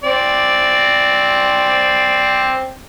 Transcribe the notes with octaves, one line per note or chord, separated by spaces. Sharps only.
C4 D5